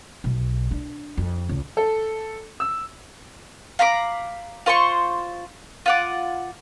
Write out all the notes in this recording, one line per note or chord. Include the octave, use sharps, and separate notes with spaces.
B1
D4
F2
C#2
A4
E6
F5 A#5 B5 D6
F4 C5 C6 C#6
F4 F#5 D6